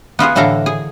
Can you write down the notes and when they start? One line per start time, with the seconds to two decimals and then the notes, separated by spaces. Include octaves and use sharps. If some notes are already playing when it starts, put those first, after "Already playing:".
0.19 B3 F4 F#4 G#4
0.35 A2 D3 E3 A4 F5 A#5
0.66 G#4